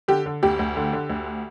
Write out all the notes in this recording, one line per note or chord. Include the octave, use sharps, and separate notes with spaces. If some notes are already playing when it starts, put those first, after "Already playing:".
D3 G4
D3
D2 G4
D2
D3
D3
D2